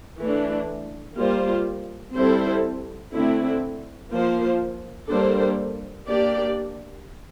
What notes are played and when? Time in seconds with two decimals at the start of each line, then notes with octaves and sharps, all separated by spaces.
0.20 E3 A3 D4
1.17 G3 A#3 F4 C5
2.15 G3 C4 E4 A4 C5
3.13 D3 A3 C4 E4
4.12 F3 A#3 F4 C5
5.09 G3 A#3 D4 A4 C5
6.08 A#3 D4 G4 D5